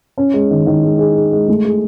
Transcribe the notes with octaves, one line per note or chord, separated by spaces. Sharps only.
C#4
G#3
D#3
D#3
G#3
G#4
G#4
G#3
A3
G#4